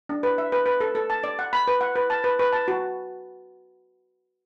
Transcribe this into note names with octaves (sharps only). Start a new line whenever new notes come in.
D4
B4
E5
B4
B4
A4
A4
A5
D5
F#5
B5
B4
F#5
B4
A5
B4
B4
A5
F#4